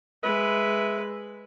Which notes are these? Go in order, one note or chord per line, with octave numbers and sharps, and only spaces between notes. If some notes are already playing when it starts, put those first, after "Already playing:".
G#3 B4 E5